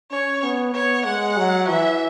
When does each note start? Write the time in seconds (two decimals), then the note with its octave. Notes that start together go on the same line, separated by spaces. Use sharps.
0.11 C#4 C#5
0.43 B3
0.74 B3 C#5
1.06 G#3 F#5
1.37 F#3
1.68 E3 E5